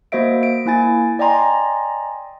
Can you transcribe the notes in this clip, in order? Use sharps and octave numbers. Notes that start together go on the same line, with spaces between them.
A#3 F#4 C5 D#5 E5 D7
D7
A#3 E4 G#5 A6
D5 D#5 G5 G#5 A#5 C6